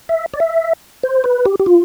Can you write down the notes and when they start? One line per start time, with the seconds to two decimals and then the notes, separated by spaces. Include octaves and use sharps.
0.09 E5
0.34 D5
0.40 E5
1.03 C5
1.24 B4
1.46 G4
1.60 G4
1.66 F4